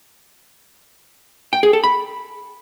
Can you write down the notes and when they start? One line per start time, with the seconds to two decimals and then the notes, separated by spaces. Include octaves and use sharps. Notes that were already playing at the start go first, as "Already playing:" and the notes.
1.53 G5
1.63 G#4
1.73 A4
1.84 B5